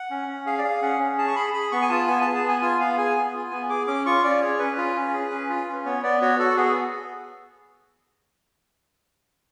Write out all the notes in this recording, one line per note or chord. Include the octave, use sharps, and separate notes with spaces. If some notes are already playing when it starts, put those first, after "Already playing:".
Already playing: F#5
C#4
C#4
G#4 F5
D5
G#4 F5
C#4 F#5
C#4
G#4 A5
C#6
G#4 B5
G#4 B5
B3 C#6
G#5
F4 A5
B3 G#5
A5
G#4
A5
B3
G#5
F4 G#5
B3 F5
G#4 G#5
B3
F4
B3
G#4 D6
C#4 D6
F4 C#6
C#4 D5
G#4 C#5
C#4 B4
F4
C#4
G#4
C#4
F4
C#4
B3 C#5
B3 D5
F#4 C#5
F#4 A4
B3 G#4